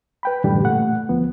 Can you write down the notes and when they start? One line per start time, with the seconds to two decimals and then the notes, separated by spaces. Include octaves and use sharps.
0.23 B4 G5 B5
0.44 F#2 A2 D3 E3 G3
0.63 A#2 A3 F#5
1.09 D2 F3 B3